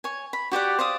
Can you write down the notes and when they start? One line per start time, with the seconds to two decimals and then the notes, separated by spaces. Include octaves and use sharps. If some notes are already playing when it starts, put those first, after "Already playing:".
0.04 C#5 G#5
0.33 B5
0.52 F#4 G4 D5 F#5
0.79 C5 D5 F5 D#6